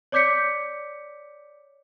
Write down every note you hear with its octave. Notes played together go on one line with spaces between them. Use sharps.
C#5 D5 D6 G6 B6 C#7